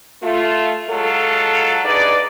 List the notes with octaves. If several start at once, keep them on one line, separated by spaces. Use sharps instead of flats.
A3 F4
F#3 G#3 F4 A4
G2 D#4 G#4 B4 D5